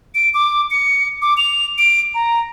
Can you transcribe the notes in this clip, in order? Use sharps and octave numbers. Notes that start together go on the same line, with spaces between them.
D7
D6
C#7
D6
F7
D7
A#5